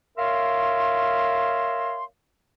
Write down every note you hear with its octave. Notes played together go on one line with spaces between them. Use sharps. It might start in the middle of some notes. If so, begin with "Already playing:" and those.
A#4 C#5 E5 F5 C6